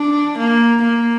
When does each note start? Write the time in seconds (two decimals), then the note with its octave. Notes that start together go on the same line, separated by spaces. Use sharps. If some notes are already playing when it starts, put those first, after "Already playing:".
Already playing: D4
0.38 A#3
0.82 A#3